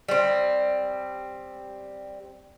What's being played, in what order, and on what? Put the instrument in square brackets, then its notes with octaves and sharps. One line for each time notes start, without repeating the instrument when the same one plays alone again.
[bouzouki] G3 C4